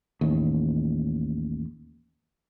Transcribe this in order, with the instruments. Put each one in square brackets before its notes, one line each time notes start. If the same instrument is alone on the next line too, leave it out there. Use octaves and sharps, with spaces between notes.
[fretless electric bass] A1 D#2